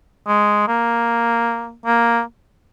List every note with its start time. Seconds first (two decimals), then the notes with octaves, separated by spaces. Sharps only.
0.27 G#3
0.68 A#3
1.86 A#3